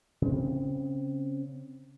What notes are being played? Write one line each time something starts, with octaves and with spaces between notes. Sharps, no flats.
C#3 C4